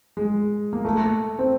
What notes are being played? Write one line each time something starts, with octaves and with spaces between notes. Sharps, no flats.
G#3
A#3
A3
C4